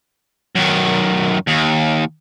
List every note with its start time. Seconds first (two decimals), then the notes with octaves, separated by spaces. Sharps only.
0.56 F#2 D#3
1.48 D#2